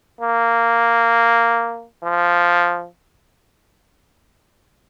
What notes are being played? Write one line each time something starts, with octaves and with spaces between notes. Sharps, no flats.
A#3
F3